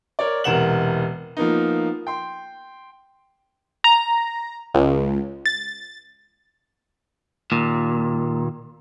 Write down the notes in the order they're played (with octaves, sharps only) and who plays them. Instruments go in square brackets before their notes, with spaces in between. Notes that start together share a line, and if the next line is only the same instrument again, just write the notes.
[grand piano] A#4 C#5 D5
E1 C3 A#4 F#5 E7 F#7
F3 A#3 B3 D#4
G5 C6
[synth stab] A#5
C#2
A6
[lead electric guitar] D#2 A#2